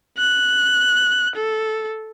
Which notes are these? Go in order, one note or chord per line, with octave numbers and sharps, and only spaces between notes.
F#6
A4